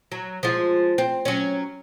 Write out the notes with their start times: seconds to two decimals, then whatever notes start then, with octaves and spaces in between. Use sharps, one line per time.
0.12 F#3
0.43 F3 G#3 F4
0.98 C4
1.25 F#3 C#4